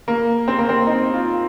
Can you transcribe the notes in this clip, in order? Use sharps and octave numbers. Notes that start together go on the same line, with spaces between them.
A#3
C4
A#3
C4
D#4
F4